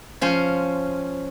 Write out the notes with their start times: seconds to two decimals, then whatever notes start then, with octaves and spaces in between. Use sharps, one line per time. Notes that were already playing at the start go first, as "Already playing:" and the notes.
0.21 F3 C#4 C5